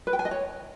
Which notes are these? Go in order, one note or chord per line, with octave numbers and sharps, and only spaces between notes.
B4
G5
G#5
D#5
C#5